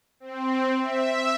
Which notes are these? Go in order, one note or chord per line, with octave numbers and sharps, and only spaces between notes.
C4
E5